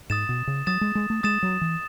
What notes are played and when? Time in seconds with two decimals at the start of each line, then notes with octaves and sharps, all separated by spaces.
0.10 G#2 D#6 A6 E7
0.29 B2
0.47 C#3
0.66 F#3 D#6 A6 E7
0.81 G#3
0.95 G#3
1.10 A3
1.23 G#3 D#6 A6 E7
1.43 F#3
1.61 E3